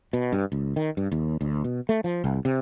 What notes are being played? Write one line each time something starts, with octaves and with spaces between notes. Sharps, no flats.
B2
G2
C#2
D#3
G2
D#2
D2
B2
A3
F3
C2
C3